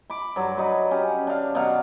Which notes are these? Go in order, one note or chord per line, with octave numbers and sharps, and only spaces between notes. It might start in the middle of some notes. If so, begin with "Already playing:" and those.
B5 D6
G2 F#3
D#4 F#4 B4
C#4 G4
D4 F5
B2 F#3 F#4 F5